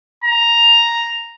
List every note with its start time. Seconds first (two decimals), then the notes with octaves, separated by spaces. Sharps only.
0.24 A#5